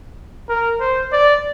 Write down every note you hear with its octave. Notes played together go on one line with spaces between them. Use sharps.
A#4
C5
D5